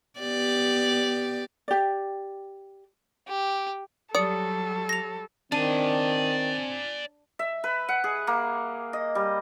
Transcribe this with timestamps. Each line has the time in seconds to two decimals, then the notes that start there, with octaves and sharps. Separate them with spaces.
0.19 B3 G4 D5
1.68 G4 D5
3.28 G4
4.15 F#3 G3 A4 D5 D#6 C#7
4.89 A#6 F7
5.52 D#3 C4 D4 D5 G#5
7.39 E5
7.64 B4
7.89 F#5
8.04 G#4
8.27 A#3
8.93 D#5
9.15 G3